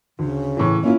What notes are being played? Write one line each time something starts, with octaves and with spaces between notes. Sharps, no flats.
D2 C#3
A2 E3
A#3 C#4 E4 F4